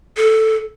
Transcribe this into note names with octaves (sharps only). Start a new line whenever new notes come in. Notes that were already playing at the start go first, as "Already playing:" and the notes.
A4